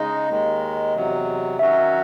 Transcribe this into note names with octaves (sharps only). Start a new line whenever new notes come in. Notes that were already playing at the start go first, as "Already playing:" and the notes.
Already playing: C#3 G#3 D#4 D#5
D#2 D#3 G#3
E2 C3 F#3
D#3 F#3 C#4 F#4 E5